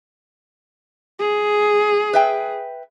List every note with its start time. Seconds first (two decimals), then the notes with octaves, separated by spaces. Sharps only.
1.20 G#4
2.13 B4 E5 G5